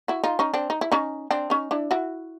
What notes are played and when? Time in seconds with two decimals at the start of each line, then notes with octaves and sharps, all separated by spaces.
0.08 E4 F#4
0.24 D#4 F4
0.39 C#4 D#4
0.54 C4 D4
0.70 D#4
0.81 E4
0.92 C#4 D#4
1.31 C4 D4
1.50 C#4 D#4
1.71 D4 E4
1.91 E4 F#4